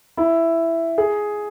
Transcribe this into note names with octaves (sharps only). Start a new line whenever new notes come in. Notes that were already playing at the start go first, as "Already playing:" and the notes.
E4
G#4